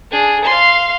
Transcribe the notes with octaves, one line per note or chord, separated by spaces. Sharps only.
D4 G#4
F5 C6